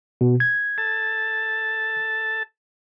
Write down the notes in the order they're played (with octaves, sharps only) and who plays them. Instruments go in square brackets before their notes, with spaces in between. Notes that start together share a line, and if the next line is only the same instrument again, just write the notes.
[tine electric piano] B2
G#6
[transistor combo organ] A4 A5